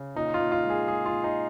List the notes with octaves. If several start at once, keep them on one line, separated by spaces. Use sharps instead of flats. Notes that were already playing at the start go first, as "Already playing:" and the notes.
Already playing: C#3
A#2 D#4
F4
A#2
F4
G#3
G#4
G#3 G#4
F4
A#2
D#4